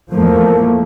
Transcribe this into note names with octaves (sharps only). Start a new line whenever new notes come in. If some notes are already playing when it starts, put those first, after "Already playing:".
E2 F3 A3 A#3